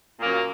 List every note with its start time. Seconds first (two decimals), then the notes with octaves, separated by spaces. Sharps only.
0.19 A#2
0.22 A#3
0.25 F#2